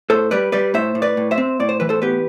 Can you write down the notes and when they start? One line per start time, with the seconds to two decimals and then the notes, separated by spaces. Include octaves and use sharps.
0.10 A2 A4 C5
0.31 G3 B4 D5
0.52 G3 B4 D5
0.74 A2 C5 E5
0.95 A2
1.02 B4 D5
1.17 A2
1.31 C5 E5
1.38 C4
1.60 A2 D5
1.69 C5
1.80 E3 B4
1.89 A4 C5
2.02 B3 G4 B4